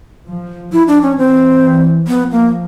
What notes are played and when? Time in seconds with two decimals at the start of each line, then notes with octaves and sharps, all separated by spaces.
0.27 F3
0.72 F3 E4
0.88 D4
1.03 C#4
1.18 E3 C4
1.63 E3
2.08 F3 B3
2.31 A#3